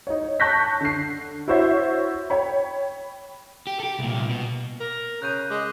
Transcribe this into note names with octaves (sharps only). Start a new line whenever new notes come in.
D#4 C#5
A5 C#6 F#6 G6 A#6 B6
D3 C7
E4 F#4 C5 C#5 E5
C#5 G5 B5
G4
G4 A4
C2 A#2
B2
A#4
C#3 F#6 G6 D#7
G#3 D6